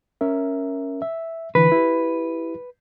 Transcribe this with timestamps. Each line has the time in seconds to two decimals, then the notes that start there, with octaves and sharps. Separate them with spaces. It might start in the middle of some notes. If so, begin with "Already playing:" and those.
0.21 C#4 A#4 E5
1.02 E5
1.55 D3 E3 B4
1.72 E4 G4